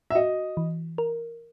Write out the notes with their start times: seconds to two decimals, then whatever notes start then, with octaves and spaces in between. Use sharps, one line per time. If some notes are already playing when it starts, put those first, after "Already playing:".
0.10 E5
0.15 F#4 D#5
0.57 E3
0.98 A#4